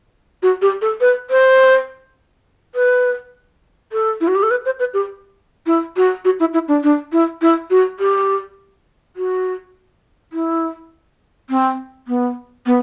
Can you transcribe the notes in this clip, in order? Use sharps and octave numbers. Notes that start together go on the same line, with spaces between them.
F#4
G4
A4
B4
C5
B4
A4
E4
F#4
G4
A4
B4
C5
B4
G4
E4
F#4
F#4
E4
E4
D4
D4
E4
E4
F#4
G4
F#4
E4
C4
B3
B3